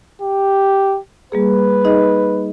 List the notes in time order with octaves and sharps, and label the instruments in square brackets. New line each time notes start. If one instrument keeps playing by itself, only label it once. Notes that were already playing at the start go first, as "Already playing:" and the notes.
[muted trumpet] G4
[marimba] G3 A#3 G#4 [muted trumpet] B4
[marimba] D#4 G#4 D#5